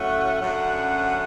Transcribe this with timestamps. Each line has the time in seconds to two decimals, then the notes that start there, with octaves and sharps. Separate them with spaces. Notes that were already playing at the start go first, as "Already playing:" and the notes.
Already playing: A2 F#3 A3 C#4 F#5
0.40 F#2 D3 F#3 A3 C#4